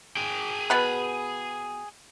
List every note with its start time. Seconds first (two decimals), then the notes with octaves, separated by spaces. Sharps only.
0.17 G#4 G5
0.70 B2 B3 B4